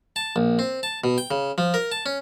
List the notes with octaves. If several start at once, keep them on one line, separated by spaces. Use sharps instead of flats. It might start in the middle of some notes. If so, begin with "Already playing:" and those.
A5
A#1
C4
A5
B2
G5
C#3
F3
A#4
A5
C#4